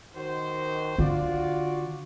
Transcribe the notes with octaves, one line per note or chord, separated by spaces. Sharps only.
D#3 F#4 C5
D3 F4 F#4 D5